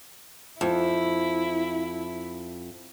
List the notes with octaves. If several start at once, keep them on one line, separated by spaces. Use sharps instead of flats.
F2 E4